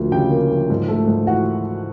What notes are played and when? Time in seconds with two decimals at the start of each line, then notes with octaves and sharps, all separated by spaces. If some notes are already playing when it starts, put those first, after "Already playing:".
Already playing: D2 F3 A#3
0.12 C#3 G4 G5
0.31 A#3
0.50 F3
0.70 G#2
0.88 A3
1.08 G#2
1.27 E3 F#4 F#5